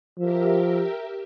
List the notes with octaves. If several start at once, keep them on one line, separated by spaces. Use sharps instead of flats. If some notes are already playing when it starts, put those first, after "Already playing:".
F3 G4 A#4 E5